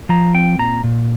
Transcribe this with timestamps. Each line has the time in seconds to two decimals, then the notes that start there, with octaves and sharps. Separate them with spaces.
0.09 F3 A#5
0.34 C4 G5
0.59 A#2 A#5
0.84 A#2